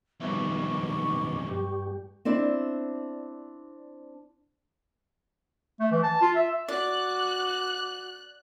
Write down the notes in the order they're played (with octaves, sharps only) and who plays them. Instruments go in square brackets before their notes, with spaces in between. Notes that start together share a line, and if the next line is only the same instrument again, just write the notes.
[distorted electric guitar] B1 F2 [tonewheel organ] D#3 B3 [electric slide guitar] G3 E5 [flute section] C#6 D6
[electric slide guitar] G2 [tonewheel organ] G3 G4
[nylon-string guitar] C4 D4 E4 D5
[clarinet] A3
E3
A5
F4
E5
[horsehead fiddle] F#4 [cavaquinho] D5 [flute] D6 [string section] F#6